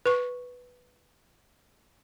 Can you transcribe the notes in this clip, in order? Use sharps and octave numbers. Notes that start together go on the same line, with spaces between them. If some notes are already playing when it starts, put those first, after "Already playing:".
B4 C#6